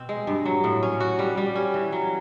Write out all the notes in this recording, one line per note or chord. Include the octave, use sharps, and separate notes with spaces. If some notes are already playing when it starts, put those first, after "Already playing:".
Already playing: B2 C4
G#3
G2
F#3
A2
C#4
F#4
G3
G3
C#4
E3
F#3